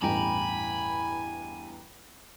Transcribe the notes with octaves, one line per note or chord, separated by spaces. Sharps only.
A1 E2 G2 G5 G#5 A#5 B5 D6